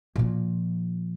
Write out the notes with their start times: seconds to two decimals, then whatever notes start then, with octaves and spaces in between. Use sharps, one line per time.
0.16 A#2 F3